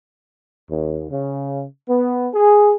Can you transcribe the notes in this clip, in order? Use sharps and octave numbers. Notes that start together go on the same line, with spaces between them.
D#2
C#3
B3
G#4